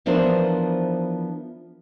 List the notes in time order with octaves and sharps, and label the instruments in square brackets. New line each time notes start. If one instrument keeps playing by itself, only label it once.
[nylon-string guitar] E3 F3 B3 D4 A#4 C5